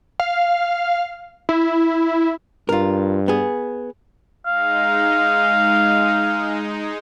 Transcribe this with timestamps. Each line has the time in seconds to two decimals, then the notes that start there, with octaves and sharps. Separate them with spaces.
0.20 F5
1.49 E4
2.69 G2 F4 A#4
3.28 B3 G#4
4.46 G#3 D#4 F5